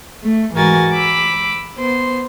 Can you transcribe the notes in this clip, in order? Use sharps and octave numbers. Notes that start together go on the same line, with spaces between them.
A3
G#2 E3 F#4 A#4 G#5 A6
B5 D6 E6
B3 C5 C6